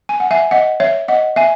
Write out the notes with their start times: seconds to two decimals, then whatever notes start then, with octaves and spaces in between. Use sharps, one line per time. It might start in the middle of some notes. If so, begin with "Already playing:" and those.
0.09 G#5
0.20 F#5
0.31 E5 G#5
0.51 D#5 F#5
0.80 C#5 E5
1.08 D#5 F#5
1.36 E5 G#5